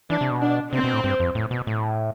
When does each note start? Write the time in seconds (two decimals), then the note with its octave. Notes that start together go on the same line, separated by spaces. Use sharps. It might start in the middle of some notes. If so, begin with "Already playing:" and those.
0.10 E3 D4
0.21 C3
0.31 B2
0.41 D4
0.73 C3 C4
0.84 B2
0.93 A2
1.04 G2
1.20 F2
1.35 A2
1.51 B2
1.67 A2